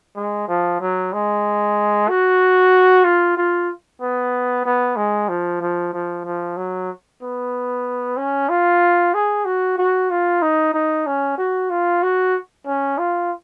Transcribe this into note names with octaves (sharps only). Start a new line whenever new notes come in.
G#3
F3
F#3
G#3
F#4
F4
F4
B3
B3
G#3
F3
F3
F3
F3
F#3
B3
C#4
F4
G#4
F#4
F#4
F4
D#4
D#4
C#4
F#4
F4
F#4
C#4
F4